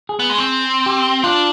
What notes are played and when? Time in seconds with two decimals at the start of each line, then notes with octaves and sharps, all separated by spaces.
0.09 G#4
0.19 B3
0.29 G#3
0.38 C4
0.86 G4
1.24 D4 F4